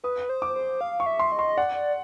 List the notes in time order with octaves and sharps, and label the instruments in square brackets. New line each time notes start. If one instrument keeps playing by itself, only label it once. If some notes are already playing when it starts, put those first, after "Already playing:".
[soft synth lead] B4 [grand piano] D#6
[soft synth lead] C5
[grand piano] D6
[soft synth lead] C5
F5
[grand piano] C#6
[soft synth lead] E5
[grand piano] C6
[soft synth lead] D#5
[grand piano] C6
[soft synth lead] D5 [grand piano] F#5